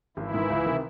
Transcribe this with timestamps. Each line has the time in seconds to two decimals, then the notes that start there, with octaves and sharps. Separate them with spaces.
0.17 G#1 E3 E4
0.34 G#2 D#3
0.50 C#2
0.66 C3 D#3